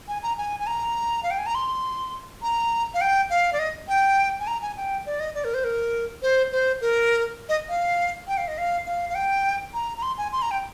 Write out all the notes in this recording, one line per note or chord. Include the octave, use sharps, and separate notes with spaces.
G#5
A#5
G#5
G#5
A#5
F5
G5
G#5
A#5
C6
A#5
F5
G5
F5
D5
D#5
G5
G#5
A#5
G#5
G5
D5
D#5
D5
A#4
C5
A#4
C5
C5
A#4
D#5
F5
G5
F5
D#5
F5
F5
F5
G5
A#5
A#5
C6
G#5
C6
A#5
G5